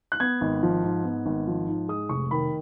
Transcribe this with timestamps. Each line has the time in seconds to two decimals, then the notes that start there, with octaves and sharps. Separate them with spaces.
0.12 F#6
0.20 B3 G#6
0.41 G#1
0.63 F3
0.83 G#2
1.04 B3
1.26 G#1
1.47 F3
1.68 G#2
1.89 G#3 D#6
2.09 F1 C#6
2.31 D#3 B5